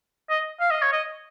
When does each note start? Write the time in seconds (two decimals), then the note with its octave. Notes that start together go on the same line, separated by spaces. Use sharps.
0.30 D#5
0.60 F5
0.71 D#5
0.82 C#5
0.93 D#5